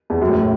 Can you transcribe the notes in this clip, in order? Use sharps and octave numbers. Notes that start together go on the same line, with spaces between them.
E2
F#2
A2